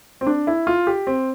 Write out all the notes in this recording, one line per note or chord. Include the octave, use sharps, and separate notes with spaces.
C4
D4
E4
F4
G4
C4